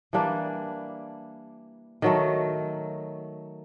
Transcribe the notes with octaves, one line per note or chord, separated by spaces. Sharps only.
E3 G3 A#3 D4
D#3 F#3 A3